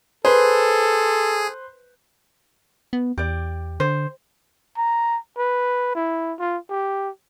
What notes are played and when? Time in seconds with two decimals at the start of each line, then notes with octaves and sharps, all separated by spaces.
0.25 G#4 A4 B4 C5
2.93 B3
3.18 E2 G4 D5
3.80 D3 C5
4.77 A#5
5.38 B4
5.95 E4
6.39 F4
6.69 G4